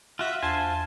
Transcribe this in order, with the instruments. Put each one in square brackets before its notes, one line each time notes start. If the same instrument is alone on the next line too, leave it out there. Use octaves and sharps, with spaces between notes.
[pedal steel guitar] F4 F#4 [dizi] E5
[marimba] E2 [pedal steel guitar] F4 C5 G#5 [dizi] A5